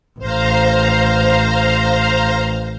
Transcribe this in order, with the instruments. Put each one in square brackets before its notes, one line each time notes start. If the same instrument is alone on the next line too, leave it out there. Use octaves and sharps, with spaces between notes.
[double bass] A1 [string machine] C5 F5 A#5